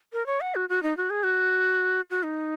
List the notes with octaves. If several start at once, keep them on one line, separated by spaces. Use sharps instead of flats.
A#4
C#5
F#5
F#4
F#4
D#4
F#4
G#4
F#4
F#4
D#4